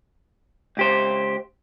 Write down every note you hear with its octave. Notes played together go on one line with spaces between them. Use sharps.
C#2 G4 C5